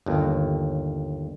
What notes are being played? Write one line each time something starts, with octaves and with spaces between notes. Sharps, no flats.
G1 D#2